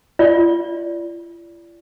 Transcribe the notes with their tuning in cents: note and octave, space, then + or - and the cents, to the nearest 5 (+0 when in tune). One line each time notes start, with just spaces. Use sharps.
F4 -45 D5 -15